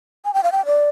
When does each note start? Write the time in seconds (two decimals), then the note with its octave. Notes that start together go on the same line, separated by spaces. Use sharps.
0.25 G#5
0.34 G5
0.43 F5
0.52 G5
0.66 D5